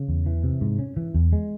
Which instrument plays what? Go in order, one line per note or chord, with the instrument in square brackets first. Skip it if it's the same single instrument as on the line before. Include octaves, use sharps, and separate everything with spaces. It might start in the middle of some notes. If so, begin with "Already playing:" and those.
Already playing: [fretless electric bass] C#3
E2
E3
C3
G#2
C#4
E3
E2
G#3